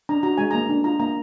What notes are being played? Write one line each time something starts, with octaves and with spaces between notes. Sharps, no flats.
D4 A#5
F#4 A#5
G#3 G#5
A#3 A#5
D4
F4 A#5
A#3 A#5